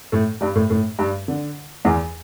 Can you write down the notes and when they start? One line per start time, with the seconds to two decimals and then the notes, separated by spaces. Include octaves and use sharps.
0.12 A2 A3
0.41 G2 G3
0.55 A2 A3
0.70 A2 A3
0.99 G2 G3
1.28 D3
1.85 E2 E3